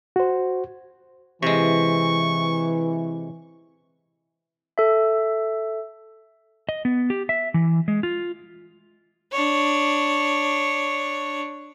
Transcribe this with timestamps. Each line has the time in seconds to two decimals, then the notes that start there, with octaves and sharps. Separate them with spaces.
0.16 F#4 C5
1.43 C3 E3 G#3 C#6
4.78 A4 E5
6.69 D#5
6.85 B3
7.10 G4
7.29 E5
7.54 E3
7.88 G#3
8.03 F4
9.32 D4 C#5